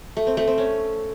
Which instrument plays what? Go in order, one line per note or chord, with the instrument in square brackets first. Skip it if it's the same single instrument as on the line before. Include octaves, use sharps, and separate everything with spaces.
[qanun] A3
C4
A3
C4
C#4